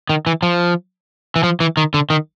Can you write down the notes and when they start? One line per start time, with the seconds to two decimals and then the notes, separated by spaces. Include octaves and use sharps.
0.09 D#3
0.27 E3
0.43 F3
1.36 E3
1.43 F3
1.60 E3
1.77 D#3
1.94 D3
2.10 D#3